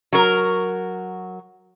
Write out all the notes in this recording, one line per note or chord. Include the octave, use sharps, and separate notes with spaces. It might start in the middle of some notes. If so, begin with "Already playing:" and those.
F#3 F#4 A#4